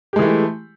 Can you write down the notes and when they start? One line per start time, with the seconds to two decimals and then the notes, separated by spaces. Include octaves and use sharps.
0.13 G4
0.16 G#3
0.19 E3
0.22 A3
0.25 E4